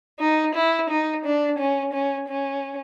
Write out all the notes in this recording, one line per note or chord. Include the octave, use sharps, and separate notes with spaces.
D#4
E4
D#4
D4
C#4
C#4
C#4